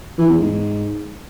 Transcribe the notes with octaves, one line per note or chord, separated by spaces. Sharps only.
E3
E2
G#2